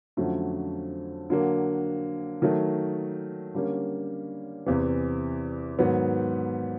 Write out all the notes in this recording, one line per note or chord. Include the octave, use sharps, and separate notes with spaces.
F2 D3 F#3 A3 C#4
D3 F#3 A#3
D#3 F#3 A3
D3 G3 A#3 C#4
E2 C3 E3
G#2 D#3 F#3 B3